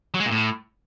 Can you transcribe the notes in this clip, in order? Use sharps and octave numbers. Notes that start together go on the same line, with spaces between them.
F#3
G#3
A#2
A2